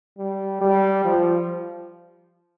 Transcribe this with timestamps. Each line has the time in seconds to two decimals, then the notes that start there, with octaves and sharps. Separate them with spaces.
0.18 G3
0.61 G3
1.04 F3